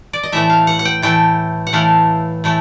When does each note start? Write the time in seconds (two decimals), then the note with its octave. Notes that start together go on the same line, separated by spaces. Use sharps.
0.13 D5
0.23 D#5
0.32 A2 E3 A3 E5
0.50 F5
0.67 F#5
0.79 F#5
0.85 G5
1.02 A2 E3 A3 G5
1.67 F#5
1.73 A2 E3 A3 F5
2.44 A2 E3 A3